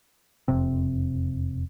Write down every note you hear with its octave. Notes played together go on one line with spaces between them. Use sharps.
E1 F2 C3 C4